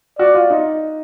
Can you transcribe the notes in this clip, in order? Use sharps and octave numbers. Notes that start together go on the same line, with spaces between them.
F#4 D5
F4
D#4